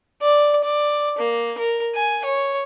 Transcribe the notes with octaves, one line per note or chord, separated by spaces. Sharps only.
D5
D5
A#3
A#4
G#5
C#5